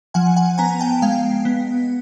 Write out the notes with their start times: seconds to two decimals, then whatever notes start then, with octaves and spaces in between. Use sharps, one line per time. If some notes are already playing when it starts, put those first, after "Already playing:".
0.14 F3 F#5 G#5
0.36 F#5 G#5
0.58 B3 G#5 A#5
0.79 G5 A5
1.02 G#3 F5 G5
1.45 B3